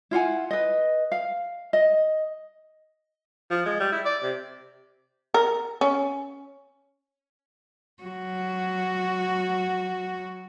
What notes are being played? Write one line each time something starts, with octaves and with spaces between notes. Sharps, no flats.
E4 F4 F#5 G#5
B4 D#5
F5
D#5
F3
G#3
G3
E4
D5
C3
A#4
C#4
F#3 F#4